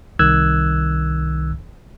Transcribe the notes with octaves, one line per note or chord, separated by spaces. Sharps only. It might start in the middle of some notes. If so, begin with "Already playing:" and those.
C2 D#3 E6 F#6 G#6